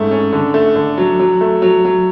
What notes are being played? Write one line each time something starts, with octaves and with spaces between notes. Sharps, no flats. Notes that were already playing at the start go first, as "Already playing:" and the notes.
Already playing: G#2 A3 C#4
C#4
D3
A3
D3
F#3
F#3
A3
F#3
F#3